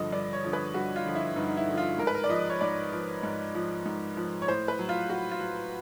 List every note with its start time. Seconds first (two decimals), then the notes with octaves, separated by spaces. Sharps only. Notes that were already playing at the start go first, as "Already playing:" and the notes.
Already playing: G2 D3 F3 D#5
0.12 G2 D5
0.33 C#5
0.44 D3 F3
0.53 B4
0.74 G2 F#4
0.96 F4
1.05 D3 F3
1.15 E4
1.36 G2 D#4
1.48 D#4
1.57 E4
1.67 D3 F3
1.78 F4
1.98 G#2 A#4
2.07 B4
2.15 A#4
2.24 D5
2.29 F3 D#5
2.50 C#5
2.61 G#2 D5
2.93 F3
3.23 G#2
3.55 F3
3.86 G#2
4.17 F3
4.42 C#5
4.48 A2 C5
4.68 B4
4.79 F#3
4.89 F4
5.09 A2 F#4
5.31 F4
5.41 F#3